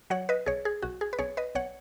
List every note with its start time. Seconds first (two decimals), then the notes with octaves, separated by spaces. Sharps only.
0.10 F#3 C#5 F#5
0.29 B4 D#5
0.46 B1 G#4 C#5
0.65 G#4
0.82 B1 F#4
1.01 G#4
1.13 B4
1.19 B1 G#4 C#5
1.37 B4 D#5
1.55 B1 C#5 F#5